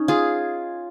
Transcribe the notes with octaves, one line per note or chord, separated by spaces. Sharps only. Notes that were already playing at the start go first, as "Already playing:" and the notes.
Already playing: C#4 D#4
F4 G#4